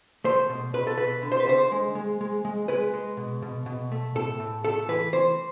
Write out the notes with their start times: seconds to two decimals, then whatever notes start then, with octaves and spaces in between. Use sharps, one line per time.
0.24 A3 C5
0.49 B2
0.74 B2 B4
0.87 A4
0.97 B2 B4
1.22 D3
1.32 C5
1.40 B4
1.47 D3 C5
1.72 G#3
1.95 G#3
2.21 G#3
2.45 G#3
2.68 G#3 B4
2.94 G#3
3.17 B2
3.42 B2
3.66 B2
3.92 A3
4.15 A2 A4
4.40 A2
4.64 A3 A4
4.88 E3 B4
5.13 E3 C5